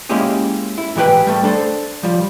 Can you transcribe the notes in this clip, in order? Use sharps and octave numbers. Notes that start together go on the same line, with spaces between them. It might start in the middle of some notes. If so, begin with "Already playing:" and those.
G#3 A#3 C#4 E4 G4 G#4
E4
G#2 E3 G4 A#4 B4 G5
G3 A3 A4
D4 A4 C5
F3 G3